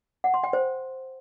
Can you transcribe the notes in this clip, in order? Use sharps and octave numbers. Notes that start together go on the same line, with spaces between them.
F#5
C6
G5
C5